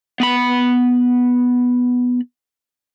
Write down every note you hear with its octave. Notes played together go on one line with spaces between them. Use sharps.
B3 B5